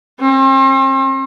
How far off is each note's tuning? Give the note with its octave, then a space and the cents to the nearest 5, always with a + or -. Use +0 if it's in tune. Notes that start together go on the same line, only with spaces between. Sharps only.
C4 +40